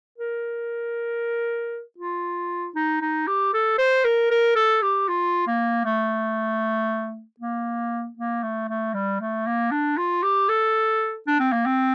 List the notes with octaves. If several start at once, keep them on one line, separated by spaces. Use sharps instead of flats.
A#4
F4
D#4
D#4
G4
A4
C5
A#4
A#4
A4
G4
F4
A#3
A3
A#3
A#3
A3
A3
G3
A3
A#3
D4
F4
G4
A4
D4
C4
A#3
C4